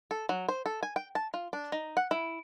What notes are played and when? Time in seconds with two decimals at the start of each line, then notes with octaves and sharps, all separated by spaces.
0.11 A4
0.29 F#3
0.49 C5
0.66 A4
0.83 G#5
0.96 G5
1.15 A5
1.34 F4
1.53 D4
1.72 D#4
1.97 F#5
2.11 E4